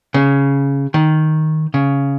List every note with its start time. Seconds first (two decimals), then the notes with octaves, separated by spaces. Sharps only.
0.14 C#3
0.94 D#3
1.74 C#3